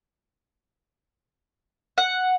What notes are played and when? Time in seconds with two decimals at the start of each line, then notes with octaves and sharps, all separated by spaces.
1.98 F#5